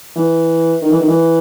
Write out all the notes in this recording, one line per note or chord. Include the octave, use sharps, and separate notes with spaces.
E3
D#3
E3
D#3
E3